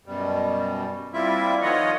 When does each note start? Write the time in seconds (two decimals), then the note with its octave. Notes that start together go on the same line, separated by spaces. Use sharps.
0.06 F#2 B2 G3
1.14 G3 A#3 C4 E4 F4 E5
1.62 D#3 F3 F4 C#5 D#5 F#5